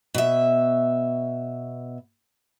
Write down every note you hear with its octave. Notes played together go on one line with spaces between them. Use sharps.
B2 E5